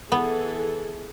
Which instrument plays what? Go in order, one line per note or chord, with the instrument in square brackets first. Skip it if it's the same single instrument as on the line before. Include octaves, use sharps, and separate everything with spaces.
[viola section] E3 G#4 A4 [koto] B3